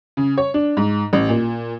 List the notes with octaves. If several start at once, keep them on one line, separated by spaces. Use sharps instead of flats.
C#3
C#5
D4
G#2
A1
A#2